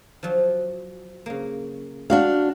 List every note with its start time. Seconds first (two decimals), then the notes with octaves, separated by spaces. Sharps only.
0.23 F3 F#3
1.26 C#3 A#3
2.10 D4 F#4 F5